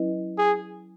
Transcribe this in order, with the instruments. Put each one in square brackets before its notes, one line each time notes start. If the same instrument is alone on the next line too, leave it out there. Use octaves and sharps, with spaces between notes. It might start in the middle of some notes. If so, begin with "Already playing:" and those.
Already playing: [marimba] F#3 C#4 E4 B4 D#5
[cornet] G#4